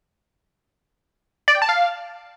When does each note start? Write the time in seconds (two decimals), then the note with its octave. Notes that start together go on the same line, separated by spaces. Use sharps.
1.48 D5
1.55 G5
1.62 A5
1.69 F5